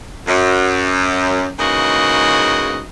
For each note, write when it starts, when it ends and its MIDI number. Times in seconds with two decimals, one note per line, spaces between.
0.27 1.49 42
1.59 2.81 44
1.59 2.81 49
1.59 2.81 52
1.59 2.81 58
1.59 2.81 66
1.59 2.81 75